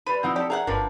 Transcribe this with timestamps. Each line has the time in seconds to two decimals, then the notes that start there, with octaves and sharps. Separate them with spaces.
0.07 G3 B4 C5 D#7
0.23 F3 C4 D#4 E4 F#5 G6
0.36 G4 A4 D5
0.50 G#4 A#4 F5 F#5
0.67 G1 F3 F#3 D4 A#4 B4